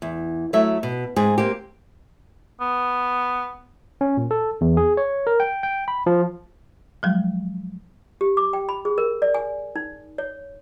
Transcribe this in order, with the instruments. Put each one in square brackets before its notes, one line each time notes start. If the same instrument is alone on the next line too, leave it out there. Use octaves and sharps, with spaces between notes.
[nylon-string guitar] E2
F#3 A3 E4 E5
B2
G#2 C4 G#4
A#3 C4 G4
[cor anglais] B3
[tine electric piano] C#4
A#2
A4
E2
G#4
C#5
A#4
G5
G5
B5
F3
[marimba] F3 F#3 G#3
[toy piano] G4
D6
G5
B5
G#4
A#4
D5
G#5
D#4
C#5